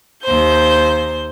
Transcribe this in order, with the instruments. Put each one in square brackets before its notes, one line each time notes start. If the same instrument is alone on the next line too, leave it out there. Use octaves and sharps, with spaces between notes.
[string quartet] D#2 C5 G6